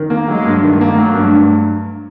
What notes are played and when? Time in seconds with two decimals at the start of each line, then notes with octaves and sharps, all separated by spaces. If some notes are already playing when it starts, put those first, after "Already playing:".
Already playing: D#3
0.10 A#3
0.28 F#3 G#3
0.46 G2
0.63 D#3 A3
0.81 A#3
0.98 F#3 A3
1.15 G2